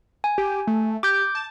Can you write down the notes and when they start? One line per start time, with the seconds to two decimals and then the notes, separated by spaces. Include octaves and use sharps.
0.24 G#5
0.38 G4
0.67 A3
1.03 G4 D6 G6
1.35 A5